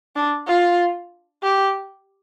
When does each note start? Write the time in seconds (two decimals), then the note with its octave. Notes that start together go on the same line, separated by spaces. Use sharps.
0.16 D4
0.48 F4
1.43 G4